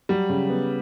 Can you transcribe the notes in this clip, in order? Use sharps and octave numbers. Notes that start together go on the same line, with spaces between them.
F#3 G3
C#3
B3